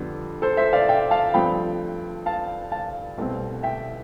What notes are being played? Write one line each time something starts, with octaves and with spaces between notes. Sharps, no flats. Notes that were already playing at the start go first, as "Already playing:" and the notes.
Already playing: F2 D3 G3 B3
A4 C5
C5 E5
D5 F5
E5 G5
F5 A5
G2 F3 A3 C4 G5 B5
F5 A5
F5 A5
C2 B2 A3 C4
E5 G5